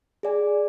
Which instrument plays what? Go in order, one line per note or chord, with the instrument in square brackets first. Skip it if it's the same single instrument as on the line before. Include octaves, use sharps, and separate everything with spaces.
[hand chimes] G#4 D5 G#5